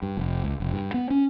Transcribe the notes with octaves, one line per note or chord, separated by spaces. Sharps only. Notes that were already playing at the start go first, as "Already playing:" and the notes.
G2
F1
C#2
F1
G2
B3
C#4